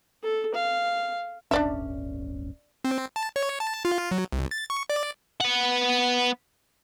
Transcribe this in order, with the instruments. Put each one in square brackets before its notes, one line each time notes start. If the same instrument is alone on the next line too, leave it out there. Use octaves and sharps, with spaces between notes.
[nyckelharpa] A4
F5
[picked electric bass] D1 G1 C#4 [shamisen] D4 D5 E5
[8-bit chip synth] C4
A5
C#5
A5
F4
F#3
C2
A6
C#6
D5
[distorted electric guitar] B3 F#5